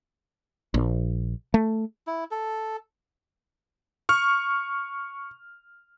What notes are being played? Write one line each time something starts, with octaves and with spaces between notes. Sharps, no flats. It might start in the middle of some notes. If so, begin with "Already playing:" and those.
A#1
A3
E4
A4
C#6 F6